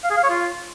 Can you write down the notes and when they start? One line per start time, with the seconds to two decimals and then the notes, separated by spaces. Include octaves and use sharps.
0.04 F5
0.10 G#4
0.17 F5
0.23 C#5
0.30 F4